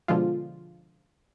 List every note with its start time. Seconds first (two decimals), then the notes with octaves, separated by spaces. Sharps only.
0.08 B2 D3 F3 G#3 F4